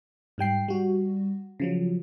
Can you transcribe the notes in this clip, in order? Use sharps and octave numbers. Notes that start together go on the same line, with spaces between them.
G#2 G3 G5 C7
G3 F#4
C#3 F3 F#3